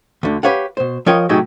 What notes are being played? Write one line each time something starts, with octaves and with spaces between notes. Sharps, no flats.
D2 D3
G4 B4 C#5 F5 F#5
B2 C5
F3 A#4 C#5 D#5 G5
A2 C3 F#3 D#4 G4 G#4